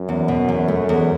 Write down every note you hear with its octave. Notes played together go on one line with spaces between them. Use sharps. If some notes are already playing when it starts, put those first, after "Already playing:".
Already playing: F#2
E2
B2
E2
A3
E2